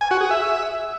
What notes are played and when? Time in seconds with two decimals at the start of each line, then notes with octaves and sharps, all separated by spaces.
0.01 G#5
0.11 F#4
0.21 G#4
0.31 E5